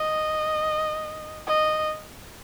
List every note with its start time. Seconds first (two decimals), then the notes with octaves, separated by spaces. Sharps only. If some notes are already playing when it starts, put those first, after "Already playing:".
Already playing: D#5
1.47 D#5